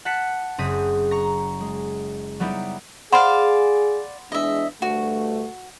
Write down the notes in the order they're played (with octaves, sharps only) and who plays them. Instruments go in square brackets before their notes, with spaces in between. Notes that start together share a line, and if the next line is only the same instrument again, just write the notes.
[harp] F#5 A5 F#6 B6 C#7
F#1 C4 G#4 D#6 B6
A#5 C#6 A#6
G#3
F#3 G3 B3 D#4 E4 G4
[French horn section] G#4 [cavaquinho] C5 D5 F5 [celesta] F#5 B5 C6
[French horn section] E2 G#3 D4 [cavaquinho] D#5 E5
[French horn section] D2 G2 A3 [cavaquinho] F#4